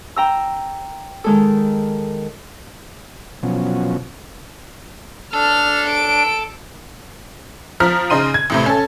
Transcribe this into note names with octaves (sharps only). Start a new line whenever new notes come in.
G5 A#5 E6
D#3 G#3 A4
B2 F3 F#3 C#4
D4 A4 F6
D7
F3 A#5 F6 B6
C#3 D#4 C6 D#7
G#6
A1 A2 C3
C#4 A4